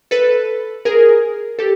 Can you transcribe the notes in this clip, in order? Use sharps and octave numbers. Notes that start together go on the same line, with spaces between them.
A4 B4
G#4 A#4
G4 A4